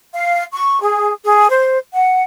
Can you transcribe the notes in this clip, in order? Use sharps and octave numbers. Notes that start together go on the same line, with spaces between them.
F5
C#6
G#4
G#4
C5
F#5